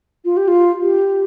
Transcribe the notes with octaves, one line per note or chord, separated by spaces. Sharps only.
F4
G4
F4
G4